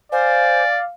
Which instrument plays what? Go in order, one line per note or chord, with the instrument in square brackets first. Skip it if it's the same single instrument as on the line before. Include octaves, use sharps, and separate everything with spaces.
[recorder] C5 [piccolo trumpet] D5 [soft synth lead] F5 [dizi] G#5